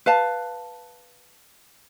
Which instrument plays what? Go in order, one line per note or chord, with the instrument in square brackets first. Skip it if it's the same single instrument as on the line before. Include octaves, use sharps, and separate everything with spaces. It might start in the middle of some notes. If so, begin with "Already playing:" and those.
[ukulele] B4 F5 A5